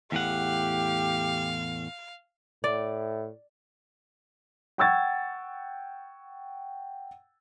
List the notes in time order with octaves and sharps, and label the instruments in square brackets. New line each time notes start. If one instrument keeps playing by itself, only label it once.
[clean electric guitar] E2 A2 F#5 [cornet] G4 [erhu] F5
[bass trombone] A2 [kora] D5
[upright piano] F#5 G5 C#6 E6 G#6 A6